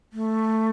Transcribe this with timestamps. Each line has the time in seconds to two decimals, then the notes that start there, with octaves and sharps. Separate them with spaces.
0.13 A3